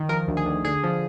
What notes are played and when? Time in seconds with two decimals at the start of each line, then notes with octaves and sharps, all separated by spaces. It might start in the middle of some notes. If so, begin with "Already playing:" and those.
Already playing: D#3
0.09 F3 A#4
0.28 D2
0.37 G#4
0.46 D2
0.65 D3 G#4
0.83 F3